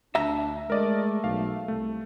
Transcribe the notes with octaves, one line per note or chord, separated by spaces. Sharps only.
D2 D4 E5 A#5
G#3 A3 A#4 D5 D#5
B1 F5
C2 A3